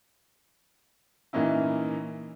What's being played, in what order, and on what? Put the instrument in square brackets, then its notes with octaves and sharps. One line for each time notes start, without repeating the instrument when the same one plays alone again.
[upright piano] A#2 E3 A#3 C#4 D#4 E4